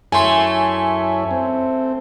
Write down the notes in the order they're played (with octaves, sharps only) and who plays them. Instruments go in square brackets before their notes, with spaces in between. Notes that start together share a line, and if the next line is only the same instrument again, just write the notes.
[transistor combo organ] F#2 E4 C#5 [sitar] A3 [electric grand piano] G#5 C6
[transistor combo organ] C4